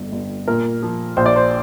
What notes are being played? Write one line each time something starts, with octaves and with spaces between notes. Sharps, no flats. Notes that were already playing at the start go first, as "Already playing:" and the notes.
Already playing: G1 F2
G1
A#2 A#4
F3
A#1 C5
D5
C5